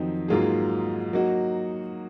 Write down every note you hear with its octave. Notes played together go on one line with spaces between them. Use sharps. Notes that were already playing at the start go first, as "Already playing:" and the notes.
Already playing: F2 D#3 F#3 C4 D#4
G#2 F#3 A#3 F4 G#4
F#3 A#3 D#4 F#4